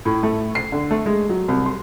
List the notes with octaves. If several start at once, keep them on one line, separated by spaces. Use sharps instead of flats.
A2
A3
C7
D3
A3
G#3
F#3
C2
C6